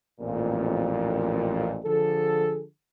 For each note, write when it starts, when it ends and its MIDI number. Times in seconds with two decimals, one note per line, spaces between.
0.20 1.79 33
0.20 1.79 41
0.20 1.79 46
1.85 2.63 50
1.85 2.63 53
1.85 2.63 68
1.85 2.63 69